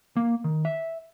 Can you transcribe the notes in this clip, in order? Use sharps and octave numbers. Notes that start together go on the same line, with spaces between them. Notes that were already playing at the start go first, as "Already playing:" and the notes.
A#3
D#3
E5